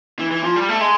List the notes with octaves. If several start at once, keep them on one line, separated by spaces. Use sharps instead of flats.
E3
E3
F3
G3
A3
G#3